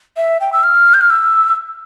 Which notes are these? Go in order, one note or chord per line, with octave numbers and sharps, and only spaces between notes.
E5
G5
E6
F6
G6
F6
E6